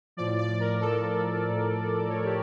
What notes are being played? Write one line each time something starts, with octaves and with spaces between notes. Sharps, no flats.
A2 F3 D5
D5
A#4
A2 F3 A4
A2 F3
A2 F3 C#5
G4